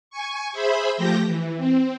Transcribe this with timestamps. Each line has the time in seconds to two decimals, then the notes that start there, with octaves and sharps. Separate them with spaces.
0.11 G#5 C#6
0.52 G#4 C5 E5 B5
0.96 F3 A3 G4 G6 A#6
1.26 E3
1.57 C4